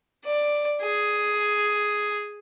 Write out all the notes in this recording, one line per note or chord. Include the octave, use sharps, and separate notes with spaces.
D5
G#4